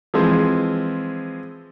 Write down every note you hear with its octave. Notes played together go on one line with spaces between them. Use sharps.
E3 F3 G#3 C4